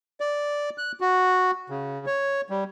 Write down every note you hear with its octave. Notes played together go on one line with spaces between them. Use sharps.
D5
F#6
F#4
C#3
C#5
G3